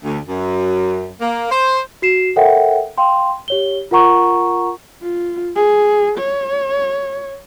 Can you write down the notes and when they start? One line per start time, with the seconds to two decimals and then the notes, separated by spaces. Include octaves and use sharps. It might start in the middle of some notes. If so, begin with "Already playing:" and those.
0.04 D2
0.28 F#2
1.21 A#3
1.51 C5
2.02 F#4 C7 E7
2.36 A4 A#4 C#5 E5 F#5 G5
2.98 F5 G5 C6
3.48 G4 C#5 G7
3.91 F4 A#4 F#5 A#5 C#6
5.02 F4
5.56 G#4
6.19 C#5